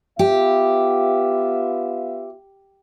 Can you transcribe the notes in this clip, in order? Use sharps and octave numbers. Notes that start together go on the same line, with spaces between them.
B3 F4 G4 E5